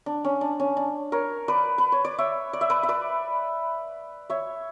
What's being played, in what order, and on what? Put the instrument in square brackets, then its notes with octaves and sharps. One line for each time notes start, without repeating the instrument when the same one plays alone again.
[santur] D4
C#4
D4
C#4
D4
A#4 C#5
B4 D5
B4
C#5
D5
C#5 E5
D5
E5
B4 D5
E5
B4 D5
C#5 E5